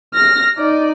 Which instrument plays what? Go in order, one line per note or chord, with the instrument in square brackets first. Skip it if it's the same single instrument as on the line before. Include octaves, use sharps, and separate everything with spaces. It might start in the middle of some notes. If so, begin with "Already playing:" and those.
[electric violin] F6 A#6
D#4 D5